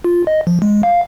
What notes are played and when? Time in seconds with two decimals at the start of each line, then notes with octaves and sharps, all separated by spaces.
0.04 F4
0.27 D#5
0.47 F3
0.62 G#3
0.83 F5